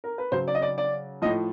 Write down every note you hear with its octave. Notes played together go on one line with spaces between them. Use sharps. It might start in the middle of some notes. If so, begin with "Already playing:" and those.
A#4
B4
C#3 F#3 C5
D5
D#5
D5
D5
A2 F3 D#5